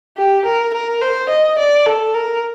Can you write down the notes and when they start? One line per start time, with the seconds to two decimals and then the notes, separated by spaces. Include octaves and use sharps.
0.17 G4
0.45 A#4
0.74 A#4
1.01 C5
1.29 D#5
1.58 D5
1.86 A4
2.14 A#4